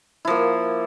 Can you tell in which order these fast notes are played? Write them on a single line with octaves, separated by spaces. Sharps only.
E4 F3 A#3